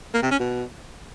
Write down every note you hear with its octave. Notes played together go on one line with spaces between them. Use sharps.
A#3
C3
C#4
B2